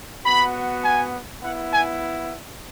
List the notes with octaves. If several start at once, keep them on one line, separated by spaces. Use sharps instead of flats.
B3 F#4 B5
G#5
B3 E4 F#5
G#5